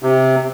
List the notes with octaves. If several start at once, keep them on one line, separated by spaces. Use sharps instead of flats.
C3